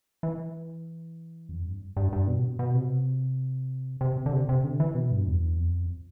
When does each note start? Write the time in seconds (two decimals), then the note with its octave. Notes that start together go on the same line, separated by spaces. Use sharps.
0.23 E3
1.49 F2
1.65 G2
1.97 G2
2.13 G2
2.27 B2
2.59 B2
2.75 C3
4.01 C3
4.26 D3
4.33 C3
4.49 C3
4.64 D3
4.80 E3
4.95 B2
5.12 G2
5.27 E2
5.58 F2